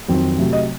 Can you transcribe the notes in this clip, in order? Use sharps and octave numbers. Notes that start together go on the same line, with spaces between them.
F2 D#3 F#3 C4
C3 F#3 A3
D#5